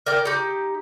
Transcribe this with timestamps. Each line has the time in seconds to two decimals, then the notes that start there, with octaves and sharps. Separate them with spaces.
0.06 A#4 D5 G5
0.25 D#4 G4